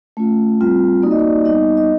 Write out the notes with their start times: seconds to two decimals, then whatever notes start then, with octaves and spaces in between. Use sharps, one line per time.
0.17 A3 C#4 F4
0.61 G3 C4 F4
1.02 A#3 D#4 F#4 D5
1.11 D#5
1.19 D5
1.45 G3 B3 D#4 D#5
1.77 D#5